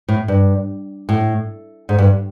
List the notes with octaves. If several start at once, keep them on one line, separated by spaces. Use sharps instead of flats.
A2
G2
A2
G#2
G2